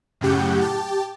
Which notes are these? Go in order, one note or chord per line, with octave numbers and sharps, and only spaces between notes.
F#2 A2 C#3 G4 F#5 G6
G4 A5